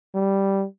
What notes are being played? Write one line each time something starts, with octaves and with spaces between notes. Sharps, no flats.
G3